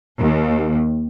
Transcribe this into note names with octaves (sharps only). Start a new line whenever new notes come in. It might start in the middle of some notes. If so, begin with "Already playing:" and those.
D#2